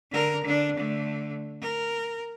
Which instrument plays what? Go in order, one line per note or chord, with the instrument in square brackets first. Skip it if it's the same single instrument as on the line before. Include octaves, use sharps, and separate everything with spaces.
[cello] D3 A#4
D3 D4
D3 A3
A#4